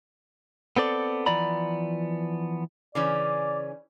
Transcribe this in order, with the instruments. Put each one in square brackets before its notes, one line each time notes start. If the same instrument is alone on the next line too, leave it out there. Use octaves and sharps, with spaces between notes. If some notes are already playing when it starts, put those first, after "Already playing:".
[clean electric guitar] B3 C4 A4 D5
E3 F3 B3 D5 A#5 B5
[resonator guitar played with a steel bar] C#3 E3 C#4 [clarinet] D5 [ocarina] D6